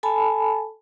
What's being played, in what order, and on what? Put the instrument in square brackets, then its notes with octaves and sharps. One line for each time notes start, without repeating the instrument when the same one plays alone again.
[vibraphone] A4 G#5 A5 B5